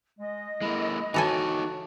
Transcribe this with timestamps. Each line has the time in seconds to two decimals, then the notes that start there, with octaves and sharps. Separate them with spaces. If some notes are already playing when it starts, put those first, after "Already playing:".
0.19 G#3 D#5
0.62 G#3 A#3 E4
1.14 E3 D#4 F#4 A4 C#5 G#5